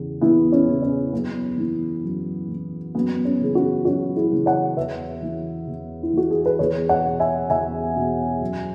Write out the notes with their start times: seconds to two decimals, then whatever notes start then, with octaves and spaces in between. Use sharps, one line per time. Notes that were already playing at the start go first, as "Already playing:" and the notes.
Already playing: E2 C#3 E3
0.21 E2 B3 E4
0.52 C#4
0.67 C#3 E3
0.83 C#4
1.13 F#2 B3
1.58 E3
2.03 F#2
2.49 E3
2.95 F#2 B3
3.25 C#4
3.40 C#3 E3 G#4
3.55 C#4 F#4
3.85 F#2 C#4 F#4
4.16 E4 G#4
4.31 C#3 E3
4.46 C#5 F#5
4.77 E2 B4 E5
5.22 E3
5.67 E2
6.03 E4
6.13 E3 F#4
6.31 G#4
6.46 B4
6.59 E2 G#4 C#5
6.89 C#5 F#5
7.04 B2
7.20 E5 G#5
7.50 E2 E5 G#5
7.95 B2
8.41 F#2